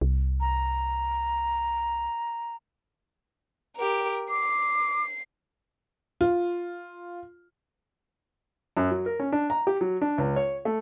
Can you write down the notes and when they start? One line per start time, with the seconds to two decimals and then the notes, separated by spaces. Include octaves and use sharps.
0.01 C2
0.40 A#5
3.76 G4 A#4
4.30 D6 C7
6.21 F4
8.77 F#2
8.91 F#3
9.06 A#4
9.20 C#4
9.32 D4
9.50 A#5
9.67 G4
9.81 F#3
10.01 D4
10.18 C#2
10.36 C#5
10.65 A3